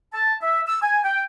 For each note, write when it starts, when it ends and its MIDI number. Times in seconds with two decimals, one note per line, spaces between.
0.14 0.35 81
0.42 0.61 76
0.67 0.81 88
0.82 1.00 80
1.04 1.22 79